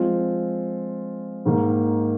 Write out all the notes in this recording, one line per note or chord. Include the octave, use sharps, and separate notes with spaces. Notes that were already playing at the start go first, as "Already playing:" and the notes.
Already playing: F3 G#3 C4 F4
G#2 D#3 A#3